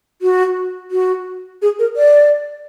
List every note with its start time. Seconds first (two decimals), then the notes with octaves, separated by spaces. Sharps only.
0.22 F#4
0.91 F#4
1.62 G#4
1.79 A#4
1.97 D5